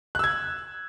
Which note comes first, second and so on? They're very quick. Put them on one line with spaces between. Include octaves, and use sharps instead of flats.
F#6 E6 G#6